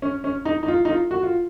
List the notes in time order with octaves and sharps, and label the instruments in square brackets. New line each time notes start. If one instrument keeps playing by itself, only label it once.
[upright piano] C#4
C#4
D#4
D#4
F4
D#4
F4
F#4
F4